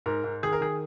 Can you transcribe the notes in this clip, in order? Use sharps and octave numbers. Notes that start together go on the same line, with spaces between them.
G#2 A#4
G#2
D#3 G#4
A#4
D#3 G#4